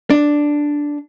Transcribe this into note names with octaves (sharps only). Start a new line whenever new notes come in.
D4